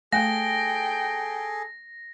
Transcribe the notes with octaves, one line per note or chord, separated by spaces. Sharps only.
A3 G#4 A4 G5 G#5 A#6